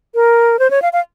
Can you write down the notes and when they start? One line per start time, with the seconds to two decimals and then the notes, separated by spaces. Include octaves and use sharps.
0.15 A#4
0.59 C5
0.71 C#5
0.82 F5
0.93 F5